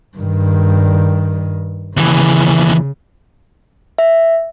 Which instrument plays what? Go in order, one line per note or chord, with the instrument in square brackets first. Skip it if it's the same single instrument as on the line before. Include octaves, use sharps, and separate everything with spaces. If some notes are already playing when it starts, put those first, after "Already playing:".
[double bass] G2 D#3
[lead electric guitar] D#2 E3 [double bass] C#3
[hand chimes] E5